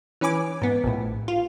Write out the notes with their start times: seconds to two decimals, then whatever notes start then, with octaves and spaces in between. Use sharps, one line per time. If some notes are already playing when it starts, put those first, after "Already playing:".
0.21 E3 C#4 B4 G#5 D6
0.62 G#2 B3
0.84 A#1 A2
1.28 F4